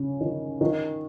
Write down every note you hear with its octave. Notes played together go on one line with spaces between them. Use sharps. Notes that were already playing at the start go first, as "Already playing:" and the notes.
Already playing: C#3
D#3
D#3